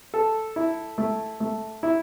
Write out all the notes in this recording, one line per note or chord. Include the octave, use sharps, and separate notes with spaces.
A4
E4
A3
A3
E4